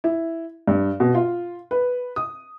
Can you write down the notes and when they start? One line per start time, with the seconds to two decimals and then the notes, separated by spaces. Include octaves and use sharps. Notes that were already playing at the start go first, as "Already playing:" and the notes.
0.04 E4
0.68 G2
1.00 B2
1.15 F4
1.71 B4
2.16 D#6